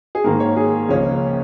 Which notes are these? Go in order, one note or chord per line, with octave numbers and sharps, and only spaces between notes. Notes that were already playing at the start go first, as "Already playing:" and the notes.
G#4
G#2 D#3 A#3 A#4
C#5
G#4
C#2 C#3 F3 A#3 C#4